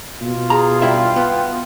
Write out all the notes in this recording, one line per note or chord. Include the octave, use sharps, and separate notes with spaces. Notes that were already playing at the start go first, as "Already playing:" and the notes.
B2 F4
G#4 A#5
G2 E4 E5 G5
B3